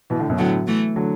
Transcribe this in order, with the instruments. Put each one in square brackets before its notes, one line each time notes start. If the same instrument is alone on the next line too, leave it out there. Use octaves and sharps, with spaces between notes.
[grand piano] B2 E3
A2 D3
F#2 B2
[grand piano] A2 D3 [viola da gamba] F#3 B3
[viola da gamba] E3 A3
[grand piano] D3 F#3